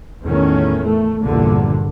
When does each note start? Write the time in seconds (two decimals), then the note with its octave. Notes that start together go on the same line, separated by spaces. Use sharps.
0.22 E2 A2 D#3 C#4
0.86 A3
1.23 A#1 E2 G2 A#2 D3